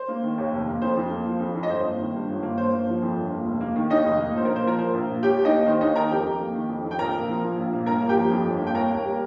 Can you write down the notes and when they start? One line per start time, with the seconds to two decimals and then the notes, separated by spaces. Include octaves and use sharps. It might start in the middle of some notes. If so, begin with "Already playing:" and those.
Already playing: C5
0.08 A#3
0.23 D#3
0.38 D#2
0.52 F1
0.67 A#3
0.82 F2 C5
0.97 F2
1.10 A#3
1.26 F3
1.40 F2
1.55 F2
1.63 D#5
1.69 G1 C5
1.84 A#3
1.99 D#3
2.14 G2
2.29 G1
2.43 A#3
2.58 G1 C5
2.73 A#3
2.88 F3
3.02 F2
3.16 G1
3.32 A#3
3.46 F1
3.60 A#3
3.76 D#3
3.90 D#2 D#4 D#5
4.05 F1
4.20 A#3
4.34 A#1 C5
4.45 A#3 A#4
4.56 C5
4.64 F3 A#4
4.78 A#2 C5
4.93 A#1
5.08 A#3
5.23 D#2 G4 G5
5.37 D#2
5.45 D#4 D#5
5.51 A#3
5.66 D#3 C5
5.81 D#2 D#4 D#5
5.95 D#2 A#4 A#5
6.11 F2 G4 G5
6.25 F2
6.40 A#3
6.55 D#3
6.69 F2
6.84 F2
6.91 G5
6.99 A#1 A#4 A#5
7.13 A#3
7.28 F3
7.43 A#2
7.58 A#1
7.73 A#3
7.86 G1 A#4 A#5
8.01 A#3
8.09 G4 G5
8.16 F3
8.32 F2
8.45 G1
8.60 A#3
8.67 G5
8.75 D#2 A#4 A#5
8.90 D#2
9.04 G3